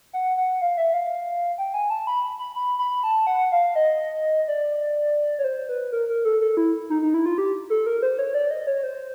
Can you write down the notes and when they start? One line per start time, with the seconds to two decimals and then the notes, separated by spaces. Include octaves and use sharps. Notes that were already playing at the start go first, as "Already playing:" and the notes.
0.13 F#5
0.37 F#5
0.61 F5
0.77 E5
0.93 F5
1.58 G5
1.74 G#5
1.90 A5
2.07 B5
2.23 B5
2.39 B5
2.55 B5
2.79 B5
3.04 A5
3.27 F#5
3.52 F5
3.76 D#5
4.48 D5
5.39 C#5
5.44 C5
5.69 B4
5.92 A#4
6.09 A#4
6.25 A4
6.41 A4
6.57 E4
6.90 D#4
7.02 D#4
7.14 E4
7.26 F4
7.38 G4
7.70 A4
7.86 A#4
8.02 C5
8.19 C#5
8.34 D5
8.51 D#5
8.67 C#5
8.83 C5